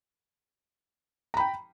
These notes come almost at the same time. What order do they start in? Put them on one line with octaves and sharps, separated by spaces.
A#5 B5 G5